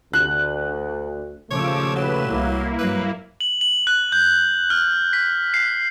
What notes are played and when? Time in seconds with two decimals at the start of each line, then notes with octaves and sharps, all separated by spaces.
0.13 D2 F#6
1.51 D#2 A#2 C#3 F3 A3 C#5 D6 E6
1.96 F#3 B4 E7
2.28 C2 A#3 E4
2.79 G2 F#3 B4
3.41 F#7
3.61 F#7
3.87 F#6
4.12 G6
4.70 F6
5.13 B6
5.54 C7